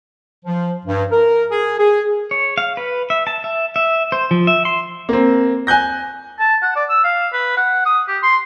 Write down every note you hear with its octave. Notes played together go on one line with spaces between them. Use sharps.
F3
G2
A#4
G#4
G#4
C#5
F5
B4
E5
A5
E5
E5
C5
F3
E5
C6
A#3 C4
G#5 F#6 G6 A#6
A5
F#5
D5
E6
F5
B4
F#5
D#6
G4
C6